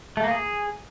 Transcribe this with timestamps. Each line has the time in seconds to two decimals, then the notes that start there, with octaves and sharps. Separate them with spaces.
0.17 A3
0.24 A#3
0.31 G#4